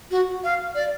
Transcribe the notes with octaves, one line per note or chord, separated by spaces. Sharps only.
F#4
F5
D5